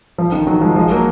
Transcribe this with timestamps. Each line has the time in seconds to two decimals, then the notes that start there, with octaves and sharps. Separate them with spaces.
0.18 F3
0.32 D#3
0.47 D#3 F#3
0.61 F3 G#3
0.76 F3 G#3
0.90 F#3 A#3